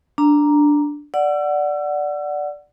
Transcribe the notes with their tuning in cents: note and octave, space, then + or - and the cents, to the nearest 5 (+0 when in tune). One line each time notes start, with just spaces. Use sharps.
D4 +0 A#5 +0
D5 +0 F#5 +0 E6 +35